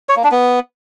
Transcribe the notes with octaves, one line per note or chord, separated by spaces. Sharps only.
C#5
A#3
D4
B3